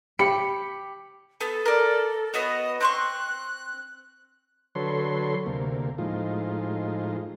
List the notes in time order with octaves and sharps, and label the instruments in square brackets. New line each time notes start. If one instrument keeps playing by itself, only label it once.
[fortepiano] G4 B5 [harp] C#7
[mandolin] B3 [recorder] A4
[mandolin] A#4 D5
[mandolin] B3 F#4 C#5 [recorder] D#5
[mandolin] C4 C6 C#6 [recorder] F#6
[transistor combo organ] D3 F#3 A4 B4 C#5 C6
D2 C3 A#3
A2 F3 G#3 D#4 F4